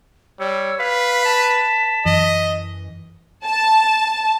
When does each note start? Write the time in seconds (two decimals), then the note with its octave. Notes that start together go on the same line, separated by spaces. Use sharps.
0.40 G3 C#5 E6
0.79 B4 F5 B6
1.25 A5
2.05 F#2 E3 D#5
3.44 A5